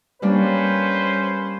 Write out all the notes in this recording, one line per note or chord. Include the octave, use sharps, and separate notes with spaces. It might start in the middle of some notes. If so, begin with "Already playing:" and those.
G3 A#3 C#4 D4 B4 C5